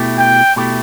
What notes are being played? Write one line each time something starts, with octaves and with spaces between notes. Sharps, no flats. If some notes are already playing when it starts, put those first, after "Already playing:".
Already playing: B2 A3 E4 G4
G5
B2 A3 E4 G4